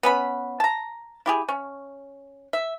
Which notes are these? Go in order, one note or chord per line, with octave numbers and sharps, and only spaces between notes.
B3 C#4 B5
A5 A#5
E4 G4 G#4
C#4
E5